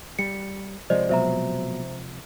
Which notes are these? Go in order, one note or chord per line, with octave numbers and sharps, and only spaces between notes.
G3 C#7
C3 F3 G#3 C5 D5 D#5
B2 F#3 C5 E5 A#5